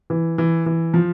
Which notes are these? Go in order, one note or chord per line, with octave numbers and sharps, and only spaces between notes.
E3
E3
E3
F3